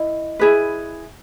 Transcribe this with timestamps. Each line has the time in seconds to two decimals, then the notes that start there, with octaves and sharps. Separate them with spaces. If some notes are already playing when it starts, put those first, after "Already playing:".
Already playing: E4 D#5
0.39 E4 G#4 B4